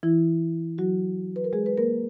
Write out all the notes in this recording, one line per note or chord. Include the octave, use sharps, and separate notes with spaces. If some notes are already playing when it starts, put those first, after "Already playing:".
E3 E4
F#3 F#4
B4
A#4
G#3 G#4
B4
A#3 A#4